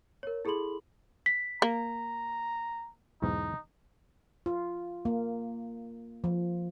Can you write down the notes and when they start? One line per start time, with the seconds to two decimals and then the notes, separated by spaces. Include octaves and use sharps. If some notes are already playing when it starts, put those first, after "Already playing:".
0.23 A#4 C#5
0.45 E4 G#4 A4 B5 C6 F#7
1.26 B6
1.62 A#3 A#5
3.22 B1 E2 G#2 D#4
4.46 F4
5.05 A#3
6.24 F3